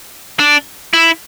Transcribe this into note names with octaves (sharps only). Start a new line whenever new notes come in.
D4
E4